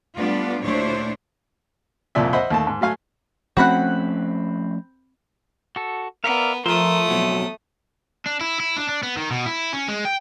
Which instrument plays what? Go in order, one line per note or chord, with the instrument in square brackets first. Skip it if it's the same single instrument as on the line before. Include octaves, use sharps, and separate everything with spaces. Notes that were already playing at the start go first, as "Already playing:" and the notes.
[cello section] G3 A3 B3 D4 F4
D2 A#2 D4 E4 C5 C#5
[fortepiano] C2 F2 A#2 D5 E5
C5 D#5 E5 F#5 B5
D#2 A3 A5
G#2
F#3 A3 F5 G#5
[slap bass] F3 A3 C#4 [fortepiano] C4 B5 F#6 [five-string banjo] F#4 F#5
[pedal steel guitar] F#4 A4
[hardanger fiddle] B3 [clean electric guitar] A#4 [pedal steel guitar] D5 E5 F5
[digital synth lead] F3 [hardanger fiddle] A3 D#6 [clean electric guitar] A#4 [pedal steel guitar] E5 C6
[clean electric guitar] F2 B2 F#3
[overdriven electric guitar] D4
E4
E4
D4
D4
B3
D#3
B2
E4
C#4
G#3
G5